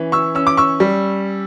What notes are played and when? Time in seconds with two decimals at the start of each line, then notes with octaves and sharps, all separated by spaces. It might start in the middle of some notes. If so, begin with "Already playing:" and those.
Already playing: E3 C#4
0.12 C#6 E6
0.35 C#4 E6
0.47 D6
0.57 C#6 E6
0.80 G3